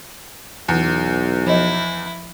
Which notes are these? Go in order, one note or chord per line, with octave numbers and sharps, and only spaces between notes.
B1 E2
F3 E4 D#5